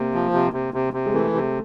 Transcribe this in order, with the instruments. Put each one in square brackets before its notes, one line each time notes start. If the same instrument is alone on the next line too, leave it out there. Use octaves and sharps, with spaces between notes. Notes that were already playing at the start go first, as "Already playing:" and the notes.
Already playing: [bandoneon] C3 [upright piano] A#3
[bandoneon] F3
C3
C3
C3
C3
[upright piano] G#3
[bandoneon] E3 [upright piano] A3
[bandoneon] C3